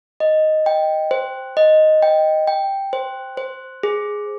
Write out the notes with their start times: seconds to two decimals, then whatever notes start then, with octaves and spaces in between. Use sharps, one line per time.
0.20 D#5
0.66 G5
1.11 C5
1.57 D#5
2.03 G5
2.47 G5
2.93 C5
3.37 C5
3.83 G#4